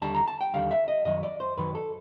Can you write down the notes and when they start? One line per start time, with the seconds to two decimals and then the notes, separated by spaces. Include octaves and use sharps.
0.02 D#2 D3 G3 A5
0.15 A#5
0.28 A5
0.41 G5
0.54 D#2 D3 G3 F5
0.71 E5
0.88 D#5
1.05 F#2 D#3 F#3 D#5
1.23 D5
1.40 C5
1.57 F#2 D#3 F#3 B4
1.75 A4